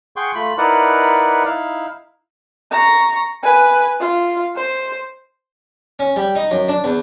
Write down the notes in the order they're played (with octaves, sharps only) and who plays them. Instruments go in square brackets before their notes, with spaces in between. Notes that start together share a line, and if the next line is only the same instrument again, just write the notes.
[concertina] G#4 F#5 G5 C6 C#6
A3 F4 B5
D#4 E4 A#4 B4 D5 F#5
D#4 E4 F5
[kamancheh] A#5 C#6
B4 G#5
F4
C5
[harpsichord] C#4
G3
D#4
F#2
D4
E2